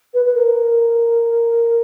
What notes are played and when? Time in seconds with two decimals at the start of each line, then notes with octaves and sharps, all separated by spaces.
0.14 B4
0.25 B4
0.34 A#4